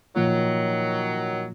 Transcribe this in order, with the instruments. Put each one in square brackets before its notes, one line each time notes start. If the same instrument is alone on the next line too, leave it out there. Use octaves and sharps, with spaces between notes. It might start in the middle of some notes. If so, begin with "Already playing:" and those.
[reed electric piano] A#2 F3 A#3 F4 [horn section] D#3 F#3